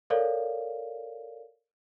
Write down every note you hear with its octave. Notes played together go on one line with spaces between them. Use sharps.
A4 A#4 C#5 D5 F5